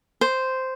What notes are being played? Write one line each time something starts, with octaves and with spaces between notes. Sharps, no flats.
C5